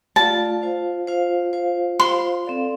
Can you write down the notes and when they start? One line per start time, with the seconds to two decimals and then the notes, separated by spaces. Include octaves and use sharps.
0.16 A3 F4 D5 F5 A5
0.62 F4 C5 F5
1.07 F4 C5 F5
1.53 F4 C5 F5
1.99 F4 C5 F5 C6
2.45 C4 A4 D5 F5